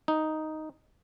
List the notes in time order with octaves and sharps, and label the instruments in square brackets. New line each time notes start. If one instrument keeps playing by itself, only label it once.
[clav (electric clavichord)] D#4